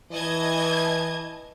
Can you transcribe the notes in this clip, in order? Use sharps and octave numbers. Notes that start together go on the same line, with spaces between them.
E3 D#5 A5 G#6